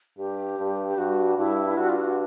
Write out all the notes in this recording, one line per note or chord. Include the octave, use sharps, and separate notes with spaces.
G2 G4
G2
G4
G2 F#4
G2 E4
G2 F#4
F4
F#4